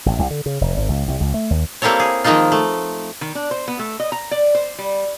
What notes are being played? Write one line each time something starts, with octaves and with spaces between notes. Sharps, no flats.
A1
C2
D3
C#3
F1
G#1
C#2
C2
C#2
A3
D#2
G3 A#3 C4 E4 A4 C#5
G#4
D#3 F3 G#3 A#3 D#4 F4
A3
D#3
D4
C5
B3
A3
D#5
A#5
D5
C5
G3